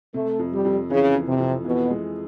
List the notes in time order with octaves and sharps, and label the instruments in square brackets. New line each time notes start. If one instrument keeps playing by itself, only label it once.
[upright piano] C3 [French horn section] A3
[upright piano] F2
[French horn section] G3
[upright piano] F2
[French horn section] C#3 [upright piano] E3
[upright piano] F2
[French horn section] C3
[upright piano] F2
[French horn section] B2 [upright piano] E3
[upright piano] G#3